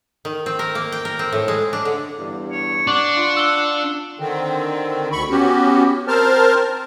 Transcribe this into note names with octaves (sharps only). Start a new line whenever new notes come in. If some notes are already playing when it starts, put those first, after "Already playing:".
D#3
C4
A#4
A#3
G5
A#4
C4
A2
G#3
D4
D3
E2 G2
C#5
D4 F#5 C#6 D6 F#7
F4
E6 G7
D3 D#3 C4
D2 B5 C#6
B3 C#4 F#4 G4
C4 A#4 C5 A5 F6